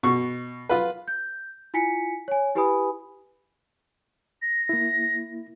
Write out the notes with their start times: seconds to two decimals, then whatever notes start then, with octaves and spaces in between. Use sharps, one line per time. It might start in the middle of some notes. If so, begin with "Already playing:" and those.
0.03 B2 C#6
0.69 F4 B4
1.08 G6
1.74 E4 F4 G#5 B6 C#7
2.28 C#5 G#5
2.55 E4 G4 B4 G#5 B5 D#6
4.42 A#6
4.69 A#3 E4